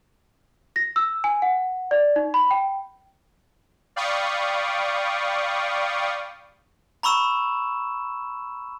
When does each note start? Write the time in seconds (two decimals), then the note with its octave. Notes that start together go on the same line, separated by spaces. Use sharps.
0.76 A#6
0.96 E6
1.24 G#5
1.42 F#5
1.91 D5
2.16 D#4
2.34 B5
2.51 G5
3.96 D5 F5 G5 B5 C#6 D#6
7.03 A#5 B5 C#6 E6 E7